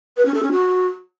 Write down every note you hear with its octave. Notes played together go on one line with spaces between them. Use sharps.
B4
C#4
A4
C#4
F#4